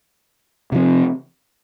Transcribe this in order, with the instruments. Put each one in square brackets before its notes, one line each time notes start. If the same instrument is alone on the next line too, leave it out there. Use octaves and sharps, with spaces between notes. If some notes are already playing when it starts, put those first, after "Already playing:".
[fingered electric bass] C3 F3 C4